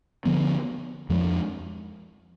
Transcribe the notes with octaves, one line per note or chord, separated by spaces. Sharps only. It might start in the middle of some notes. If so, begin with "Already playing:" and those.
D3 F3 B3
F2 F3 G#3